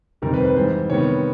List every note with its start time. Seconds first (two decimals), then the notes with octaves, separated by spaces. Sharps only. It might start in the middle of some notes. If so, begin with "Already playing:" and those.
0.22 F2 C3 D#3 G3 A#4
0.34 B4
0.40 C5
0.45 B4
0.56 G#2 E3 G3 C5
0.90 C3 D#3 G3 B3 C#5